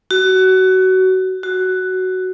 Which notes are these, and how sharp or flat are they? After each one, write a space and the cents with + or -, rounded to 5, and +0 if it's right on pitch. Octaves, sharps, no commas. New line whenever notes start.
F#4 +20
F#4 +10